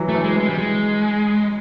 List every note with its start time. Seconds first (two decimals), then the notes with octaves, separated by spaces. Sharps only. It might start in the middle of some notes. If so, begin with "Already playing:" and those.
Already playing: E3 F#3
0.09 A3
0.14 E3
0.24 G#3
0.36 E3 G#3
0.49 G3
0.58 G#3